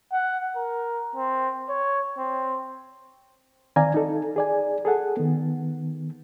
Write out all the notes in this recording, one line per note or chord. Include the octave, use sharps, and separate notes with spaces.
F#5
A#4
C4
C#5
C4
D#3 C4 D5 F5 G#5 A#5
D#4 A4
G#4 D5 G#5
G#4 A4 F#5
D#3 B3